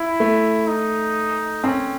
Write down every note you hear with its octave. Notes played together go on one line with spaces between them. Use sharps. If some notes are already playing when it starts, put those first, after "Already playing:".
Already playing: E4
A3
D#4
C4 C#4